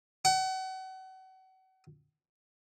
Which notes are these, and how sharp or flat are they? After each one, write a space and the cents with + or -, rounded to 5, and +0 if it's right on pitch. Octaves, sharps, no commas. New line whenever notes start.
F#5 +35